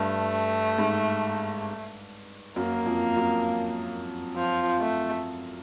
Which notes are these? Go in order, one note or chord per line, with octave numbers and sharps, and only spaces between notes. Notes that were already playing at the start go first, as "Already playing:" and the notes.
Already playing: G2 A3
G#2
F#2 A#3
F2
F#2
F3
A3